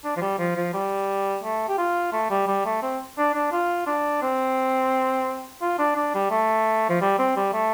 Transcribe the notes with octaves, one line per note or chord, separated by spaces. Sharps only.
D4
F3
G3
F3
F3
G3
A3
G4
F4
A3
G3
G3
A3
C4
D4
D4
F4
D4
C4
F4
D4
D4
G3
A3
F3
G3
C4
G3
A3